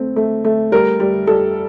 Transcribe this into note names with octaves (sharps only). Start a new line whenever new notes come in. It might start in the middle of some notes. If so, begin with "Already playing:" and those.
Already playing: A3 C4
A3
A3
G3 A#4
G3
G3 A4